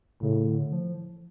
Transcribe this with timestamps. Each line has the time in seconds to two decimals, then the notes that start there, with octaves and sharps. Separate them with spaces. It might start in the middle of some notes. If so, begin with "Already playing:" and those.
0.22 A2 C#3
0.47 D3
0.73 F3